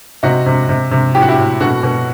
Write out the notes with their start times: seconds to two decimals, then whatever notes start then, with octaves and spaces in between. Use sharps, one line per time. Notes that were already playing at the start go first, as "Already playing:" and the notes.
0.23 C3 D#4 F#4
0.46 C3
0.69 C3
0.91 C3
1.15 A2 G4
1.22 F#4
1.28 E4 G4
1.38 A2
1.61 B2 F#4 A4
1.83 B2